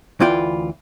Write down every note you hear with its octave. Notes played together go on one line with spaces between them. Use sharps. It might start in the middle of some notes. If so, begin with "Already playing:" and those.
D2 E3 E4 F4 D5 G5